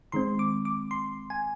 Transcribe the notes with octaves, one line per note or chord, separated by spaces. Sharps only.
D#3 G#3 C4 C6
D6
D6
C6
G#5